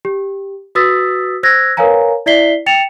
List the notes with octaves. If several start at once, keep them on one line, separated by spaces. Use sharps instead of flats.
G4
F#4 B4 D#6 E6 A6 B6
C5 E6 F#6 G#6 A#6
A#4 B4 C#5 F5 G#5 A#5
E4 D5 E5 B6 C7 G7
G5 A6 C#7 E7 F7